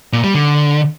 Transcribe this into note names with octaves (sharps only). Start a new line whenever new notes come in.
A#2
G3
D3